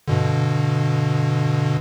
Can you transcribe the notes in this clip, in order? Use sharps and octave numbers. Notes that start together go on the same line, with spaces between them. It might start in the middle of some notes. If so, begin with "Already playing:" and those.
G2 B2 D3